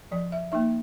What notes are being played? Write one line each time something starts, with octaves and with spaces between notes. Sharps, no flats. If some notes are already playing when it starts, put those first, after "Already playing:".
F3 D5
E5
A#3 D#4 E5